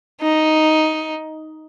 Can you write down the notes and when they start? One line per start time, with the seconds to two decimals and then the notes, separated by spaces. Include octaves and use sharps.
0.22 D#4